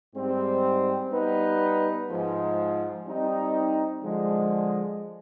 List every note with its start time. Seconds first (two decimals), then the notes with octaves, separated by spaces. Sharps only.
0.14 G#2 G3 C4
1.11 G3 B3 D#4 B4
2.08 G#2 F3 G#3
3.05 G3 C4 D#4
4.02 D3 F3 G#3